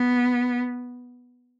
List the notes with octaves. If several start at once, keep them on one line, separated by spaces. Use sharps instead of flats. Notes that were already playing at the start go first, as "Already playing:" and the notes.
Already playing: B3